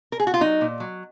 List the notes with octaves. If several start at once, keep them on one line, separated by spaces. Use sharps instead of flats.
A#4
G#4
F#4
F4
F#3 D#4
A#2
F#3